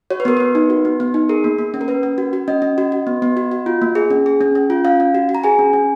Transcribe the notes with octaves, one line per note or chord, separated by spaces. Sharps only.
F#4 C#5
B4
B3 A#4
B3 B4
D#4
F#4
B3
B3
D#4
G#4 A#4
A#3
A#3
C#4
A#4
C#4 B4
C#4
F#4
F#4
C#4 D#5
C#4
F#4
F#4
B3
B3
F#4
F#4
F4
A#3
G#4
C#4
G#4
C#4
C#4
F4
C#4 F5
C#4
F#4
F#4
A#5
G#4 G#5
C#4
C#4